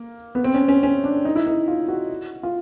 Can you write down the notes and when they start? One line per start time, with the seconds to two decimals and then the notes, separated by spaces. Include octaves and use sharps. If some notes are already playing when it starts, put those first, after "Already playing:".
Already playing: A#3
0.35 B3
0.44 C4
0.54 C#4
0.68 C#4
0.83 C#4
1.04 D4
1.25 D#4
1.36 E4
1.46 D#4
1.68 F4
1.88 F#4
2.43 F4